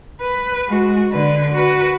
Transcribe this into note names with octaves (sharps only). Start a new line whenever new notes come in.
B4
G#3 F#4
D3 B4
F#4 B4